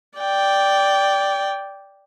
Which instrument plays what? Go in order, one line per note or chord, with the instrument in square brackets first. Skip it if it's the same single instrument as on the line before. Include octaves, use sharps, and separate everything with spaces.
[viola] D5 G5